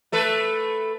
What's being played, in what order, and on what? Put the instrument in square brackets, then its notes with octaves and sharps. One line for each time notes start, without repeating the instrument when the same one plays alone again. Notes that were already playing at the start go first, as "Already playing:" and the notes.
[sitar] A3 A4 B4